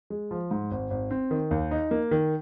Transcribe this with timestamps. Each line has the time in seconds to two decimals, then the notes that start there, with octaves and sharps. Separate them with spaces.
0.10 G#3
0.31 F3
0.51 G#2
0.71 G#1
0.90 G#1
1.11 C4
1.31 D#3
1.51 D#2
1.71 D#4
1.91 A#3
2.11 D#3